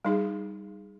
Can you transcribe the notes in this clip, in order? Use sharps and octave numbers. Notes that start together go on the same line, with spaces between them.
G3 D#4 G#4